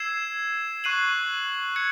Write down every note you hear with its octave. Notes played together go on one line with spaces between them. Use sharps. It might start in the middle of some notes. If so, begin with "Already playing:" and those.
Already playing: E6 G#6 C7 E7
C#6 F#6 C7 D#7 F#7
G#6 C#7